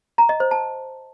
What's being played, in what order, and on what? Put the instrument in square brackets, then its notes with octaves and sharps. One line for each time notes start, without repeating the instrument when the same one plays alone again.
[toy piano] A#5
D#5
C5
A5